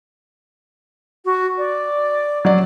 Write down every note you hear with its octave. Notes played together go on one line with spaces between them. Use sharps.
F#4
D5
F#3 D5